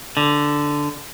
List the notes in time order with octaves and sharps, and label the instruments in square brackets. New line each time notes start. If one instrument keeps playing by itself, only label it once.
[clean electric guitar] D3